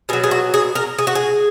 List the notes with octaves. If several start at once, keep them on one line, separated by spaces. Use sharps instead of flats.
B2 F#3 G#4
G#4
F#4
G#4
A#4
G#4
F#4
G#4